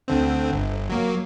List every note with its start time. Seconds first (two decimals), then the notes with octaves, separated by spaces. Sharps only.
0.08 D2 D3 C4
0.52 G1
0.90 F#3 A#3